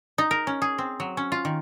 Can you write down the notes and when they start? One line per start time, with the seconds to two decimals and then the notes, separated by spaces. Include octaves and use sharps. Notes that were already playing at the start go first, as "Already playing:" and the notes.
0.18 D#4
0.31 A#4
0.47 C#4
0.62 G#4
0.78 C4
1.00 F#3
1.17 C#4
1.32 F4
1.45 D#3